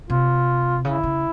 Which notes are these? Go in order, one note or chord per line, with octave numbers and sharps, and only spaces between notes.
C3 F4
C#3 E4
C#3